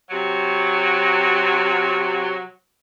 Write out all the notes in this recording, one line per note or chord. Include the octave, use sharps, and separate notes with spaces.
C3 F#3